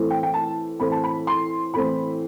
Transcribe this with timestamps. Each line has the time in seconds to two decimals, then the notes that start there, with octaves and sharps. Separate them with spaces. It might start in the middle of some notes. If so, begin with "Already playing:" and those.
Already playing: A2 E3 A3 C4
0.10 G5
0.23 G5
0.34 A5
0.80 A2 E3 A3 C4 B5
0.92 A5
1.04 B5
1.27 C6
1.74 A2 E3 A3 C4 B5